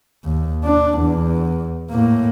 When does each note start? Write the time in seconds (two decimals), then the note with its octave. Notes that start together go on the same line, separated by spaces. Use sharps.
0.25 D#2
0.64 D4
0.99 E2
1.91 A2 A#3